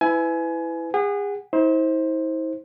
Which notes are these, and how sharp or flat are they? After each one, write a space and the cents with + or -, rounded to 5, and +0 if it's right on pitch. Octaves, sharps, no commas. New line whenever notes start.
E4 +0 B4 +30 G#5 +25
G#4 -35 F#5 +0
E4 -45 C5 +15